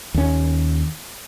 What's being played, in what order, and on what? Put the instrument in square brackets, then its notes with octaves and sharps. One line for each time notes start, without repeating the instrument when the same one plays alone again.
[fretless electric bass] D#2 C#4